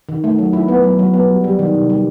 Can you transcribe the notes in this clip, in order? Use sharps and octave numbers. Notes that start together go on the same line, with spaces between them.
D#3
A3
F#3
E4
B3
F#3
F#3
B3
G3
G3
D#3
C3
G3